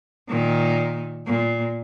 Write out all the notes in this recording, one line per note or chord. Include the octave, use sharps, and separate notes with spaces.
A#2 D#3
A#2